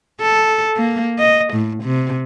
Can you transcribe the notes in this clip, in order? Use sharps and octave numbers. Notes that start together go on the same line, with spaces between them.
A4
A#3
D#5
A2
C3